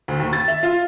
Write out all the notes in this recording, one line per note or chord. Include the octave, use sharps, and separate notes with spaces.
D2
D#2
A6
E5
F4